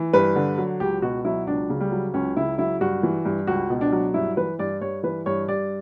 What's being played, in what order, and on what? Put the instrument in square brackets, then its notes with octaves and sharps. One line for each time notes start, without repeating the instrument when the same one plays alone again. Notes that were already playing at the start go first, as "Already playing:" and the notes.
Already playing: [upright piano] E3
G2 B4
D3
F#3
C#2 G4
B2 F#4
F#3 E4
C#2 D4
C#3
G3
F#3
C#2 C#4
C#3 E4
F#3 E4
G2 F#4
E3
G2
C#2 F#4
B2
D4
F#3
G2 E4
E3 B4
G2 D5
G2 C#5
E3 B4
G2 C#5
G2 D5